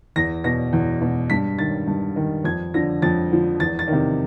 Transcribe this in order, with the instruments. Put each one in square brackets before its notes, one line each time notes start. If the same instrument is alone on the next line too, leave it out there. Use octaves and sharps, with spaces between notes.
[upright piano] E2 A#6
B2 A#6
E2
B2
G2 B6
D#3 A6
G2
D#3
F2 G#6
D3 F3 A#6
F2 A6
D3 F3
E2 A6
A6
C3 D#3